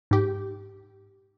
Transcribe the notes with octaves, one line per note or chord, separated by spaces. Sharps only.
G#2 G4